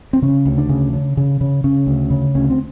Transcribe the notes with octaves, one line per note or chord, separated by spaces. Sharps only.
C4
C#3 C#4
D2
D4
C#3
C#3
C#3
C#3
C#3 C#4
D2
C#3
D2 C#4
C4